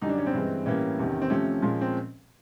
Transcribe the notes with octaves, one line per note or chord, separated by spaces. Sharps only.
F#2 D3 G3 D#4
D4
C#4
C4
G2 E3 G#3
A2 E3 G3 A#3 C#4
E2 C3 D#3
C4
C3 F3 A3 C#4
A#2 F3 G#3
C4